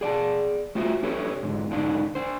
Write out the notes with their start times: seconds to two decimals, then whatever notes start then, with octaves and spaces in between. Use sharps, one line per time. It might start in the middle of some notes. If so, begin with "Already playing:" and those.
0.01 G#4 D5 G5 A5
0.75 A3 F4 F#4 C5 E5
1.03 D4 G4 A4 B4 C#5
1.43 G#2 D3
1.71 G#2 D3 D4 D#4 F5
2.15 D4 C5